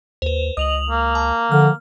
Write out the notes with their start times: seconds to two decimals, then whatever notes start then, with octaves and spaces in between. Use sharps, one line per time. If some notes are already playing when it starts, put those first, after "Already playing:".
0.22 D#2 B4 C5
0.57 C#2 D#5 D#6 F7 F#7
0.90 A#3
1.15 A5
1.52 D3 F3 F6